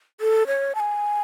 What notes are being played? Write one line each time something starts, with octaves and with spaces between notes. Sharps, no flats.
A4
C#5
A5
G#5